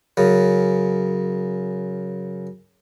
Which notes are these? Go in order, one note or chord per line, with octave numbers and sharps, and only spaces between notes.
F#2 C#3